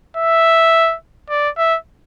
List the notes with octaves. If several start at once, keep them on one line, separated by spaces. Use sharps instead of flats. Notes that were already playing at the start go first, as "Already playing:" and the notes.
E5
D5
E5